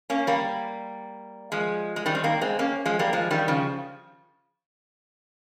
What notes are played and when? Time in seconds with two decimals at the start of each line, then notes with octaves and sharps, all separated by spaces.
0.10 A#3 C#4
0.27 G3 A#3
1.52 F3 G#3
1.96 G#3
2.06 D#3 G3
2.15 C4
2.24 G3 A#3
2.41 G#3 C4
2.59 A#3 C#4
2.86 F3 G#3
2.99 G3 A#3
3.13 F3 G#3
3.31 D#3 G3
3.48 C#3 F3